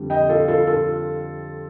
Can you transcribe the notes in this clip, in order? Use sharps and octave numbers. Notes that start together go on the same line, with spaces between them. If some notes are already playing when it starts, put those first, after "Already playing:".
Already playing: F2 D3 G3
D#5 G5
F4 A4
F4 A4
F4 A4